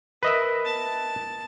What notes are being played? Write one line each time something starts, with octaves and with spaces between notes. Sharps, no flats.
A#4 B4 D#5 E5
A5